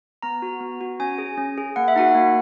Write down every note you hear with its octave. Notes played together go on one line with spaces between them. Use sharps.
B3 A#5
F#4
B3
F#4
C#4 G#5
G#4
C#4
G#4
A#3 F#5
E5
D#4 F#4 F#5
A#3